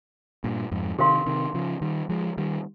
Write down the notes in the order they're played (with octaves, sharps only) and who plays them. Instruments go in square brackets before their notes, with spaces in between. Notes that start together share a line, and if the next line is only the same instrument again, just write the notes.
[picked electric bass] G2 A#2
F2 G#2
[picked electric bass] C3 D#3 [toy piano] G4 A#4 F5 C6
[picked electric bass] C3 D#3
C#3 F3
D#3 G3
F3 G#3
D#3 G3